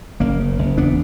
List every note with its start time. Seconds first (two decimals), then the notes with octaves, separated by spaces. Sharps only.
0.20 F#1 A#3 C#4
0.40 C#3
0.58 F#1
0.77 E2 B3 D4